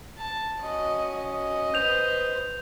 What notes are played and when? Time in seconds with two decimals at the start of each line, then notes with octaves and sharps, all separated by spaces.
0.18 A5
0.62 C#4 F#4 D#5
1.25 D#5
1.74 B4 C5 G6 F7